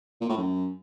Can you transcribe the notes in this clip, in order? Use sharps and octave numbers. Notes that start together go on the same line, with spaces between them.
A#2
A2
F#2